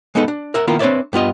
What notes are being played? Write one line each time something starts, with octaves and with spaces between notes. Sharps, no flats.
G#3 B3 D#4 A4 B4
D4
A#4 E5 F#5
D#3 A#3 B3 E4 F4 A#4
C4 D4 B4 C#5 D5 E5
G2 B3 F4 D#5